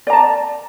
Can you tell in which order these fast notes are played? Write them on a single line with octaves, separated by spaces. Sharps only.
D5 A#5 A5